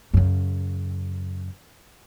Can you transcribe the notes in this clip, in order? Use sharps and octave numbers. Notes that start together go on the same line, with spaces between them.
F#2 C#3